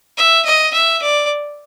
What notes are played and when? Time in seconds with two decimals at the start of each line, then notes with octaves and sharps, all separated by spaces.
0.17 E5
0.45 D#5
0.73 E5
1.02 D5